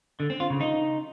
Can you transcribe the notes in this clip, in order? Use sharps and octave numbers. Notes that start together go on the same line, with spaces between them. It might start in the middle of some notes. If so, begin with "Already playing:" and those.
D3
C4
F4
C#3
D#4